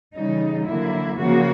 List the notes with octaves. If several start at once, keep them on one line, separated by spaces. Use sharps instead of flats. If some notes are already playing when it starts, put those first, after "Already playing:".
C#3 E3 G3 D#4
D3 F#3 A#3 E4
C#3 F3 A#3 F#4